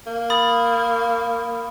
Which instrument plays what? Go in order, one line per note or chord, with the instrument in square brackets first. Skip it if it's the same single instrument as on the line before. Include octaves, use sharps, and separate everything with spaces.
[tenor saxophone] A#3
[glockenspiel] B5 D#6 A6